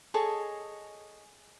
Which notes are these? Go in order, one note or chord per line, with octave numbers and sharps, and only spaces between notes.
G#4 A4 C#5 D#5